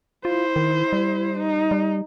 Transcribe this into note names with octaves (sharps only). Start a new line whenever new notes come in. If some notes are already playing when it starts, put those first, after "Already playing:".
E4 F4 C5
D#3
G3
D#4
G3